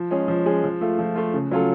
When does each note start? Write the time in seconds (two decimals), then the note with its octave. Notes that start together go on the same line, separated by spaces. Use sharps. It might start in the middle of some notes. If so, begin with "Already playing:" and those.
Already playing: F3
0.11 G#3 C#4 G#4
0.28 F3
0.46 G#3 C#4 G#4
0.64 F3
0.81 A3 F4
0.99 F3
1.16 A3 F4
1.34 C#3
1.51 F#3 C#4 F4 A4